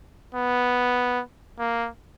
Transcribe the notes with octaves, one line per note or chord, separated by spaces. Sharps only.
B3
A#3